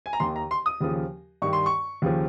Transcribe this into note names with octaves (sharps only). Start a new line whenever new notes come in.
G#5
A#5
D#2 D#3 C6
A#5
C6
D#6
D#2 C#3 F3
G2 D#3 C#6
C6
C#6
D#2 C#3 F3